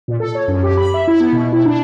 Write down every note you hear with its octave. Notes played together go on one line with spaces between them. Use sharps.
A#2
A4
C#5
F#2
G4
B5
E5
E4
B3
B2
E4
D4